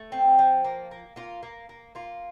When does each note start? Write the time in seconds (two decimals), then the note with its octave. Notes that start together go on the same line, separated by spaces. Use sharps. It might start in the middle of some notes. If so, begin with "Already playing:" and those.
Already playing: A3
0.12 C4
0.39 F3
0.64 A#3
0.91 A#3
1.16 A#3 F4
1.43 A#3
1.69 A#3
1.95 A#3 F4